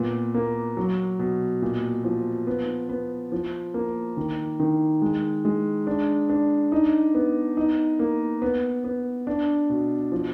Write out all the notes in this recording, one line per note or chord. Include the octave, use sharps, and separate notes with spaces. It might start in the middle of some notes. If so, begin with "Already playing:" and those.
Already playing: A#2 B3
A#3
F#3
B2
A#2
F3
B3
B3
F3
A#3
D#3
D#3
G#3
G#3
D4
D4
D#4
B3
D#4
A#3
B3
B3
D4
B2
F3